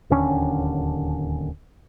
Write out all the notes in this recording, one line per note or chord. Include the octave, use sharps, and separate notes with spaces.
D1 D#2 D3 C#4